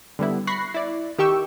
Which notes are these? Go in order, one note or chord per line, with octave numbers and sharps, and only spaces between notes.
D3 G3 B3 E4
B5 C#6 F#6 A#6 C7
E4 D5
D#3 G4 G5 C#6 E6